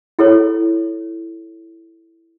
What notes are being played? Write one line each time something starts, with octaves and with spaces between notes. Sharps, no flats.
E4 A4 C#5